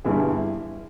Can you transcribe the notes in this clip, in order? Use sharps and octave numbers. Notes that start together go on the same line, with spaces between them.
G1 G2 E3 G3 E4 G#4